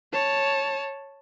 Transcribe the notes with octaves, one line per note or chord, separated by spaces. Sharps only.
C#5 A5